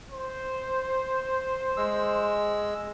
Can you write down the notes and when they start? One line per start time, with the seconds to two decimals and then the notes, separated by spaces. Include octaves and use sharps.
0.11 C5
1.77 G#3 E6